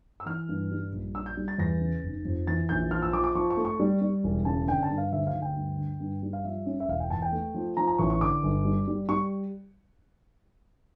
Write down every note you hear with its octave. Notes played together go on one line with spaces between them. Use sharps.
E6
E3 F6
G2
G3
A#1
D4 E6
G6
G3
A6
E2 A#6
C#3
F1
F2
E3 A6
A#1 G6
F3 F6
E6
F3 D6
D6
F3 C#6
C#6
A3
C#6
G3
G3
E1
C#3 A5
D3 G5
A5
G2
F5
D2 E5
F5
D2
G5
G2
D3
G2
G3
F5
F3 E5
C#4
E5
E1 F5
G5
E2 A5
G5
A3
F3
F3 A#5
A#5
A1 C#6
C#6
D3 D6
G1
G3
G3
G3 C#6